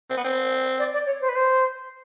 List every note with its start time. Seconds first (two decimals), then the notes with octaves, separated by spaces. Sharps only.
0.10 C4
0.17 B3
0.24 C4
0.79 D5
0.93 D5
1.06 C#5
1.21 C5
1.28 B4
1.35 C5